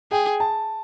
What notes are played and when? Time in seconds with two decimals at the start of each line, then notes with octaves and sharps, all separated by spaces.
0.11 G#4 G5
0.40 A5